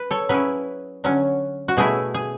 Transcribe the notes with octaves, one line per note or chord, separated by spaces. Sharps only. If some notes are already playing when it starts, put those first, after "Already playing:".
Already playing: B4
A4 C#5
F#3 C#4 E4 G#4 B4
D3 F#3 C#4
F#4
B2 A3 E4 G#4
G#4